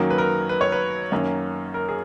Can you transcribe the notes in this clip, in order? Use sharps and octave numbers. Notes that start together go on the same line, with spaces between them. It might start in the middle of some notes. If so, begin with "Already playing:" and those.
Already playing: F#2 D#3 F#3 A#3 C#4
B4
A#4
B4
C#5
B4
F#2 D#3 A#3 C#4
A#4
G#4